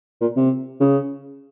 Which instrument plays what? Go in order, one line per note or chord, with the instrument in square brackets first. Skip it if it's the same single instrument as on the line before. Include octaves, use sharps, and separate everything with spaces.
[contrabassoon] A#2
C3
C#3